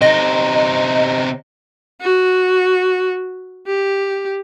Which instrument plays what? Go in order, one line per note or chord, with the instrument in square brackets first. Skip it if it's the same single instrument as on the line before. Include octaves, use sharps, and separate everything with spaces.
[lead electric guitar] C3 D#4 [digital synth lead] D#5
[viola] F#4
G4